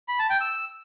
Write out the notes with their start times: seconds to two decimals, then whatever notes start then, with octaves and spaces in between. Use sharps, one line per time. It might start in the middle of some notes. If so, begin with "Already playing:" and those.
0.08 B5
0.19 A5
0.30 G5
0.41 E6